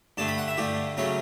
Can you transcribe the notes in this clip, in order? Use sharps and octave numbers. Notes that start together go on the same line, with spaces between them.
G2 D3 A3 A5
B5
F#5
E5
G2 D3 A3 G4
C#3 F#3 A3 C#4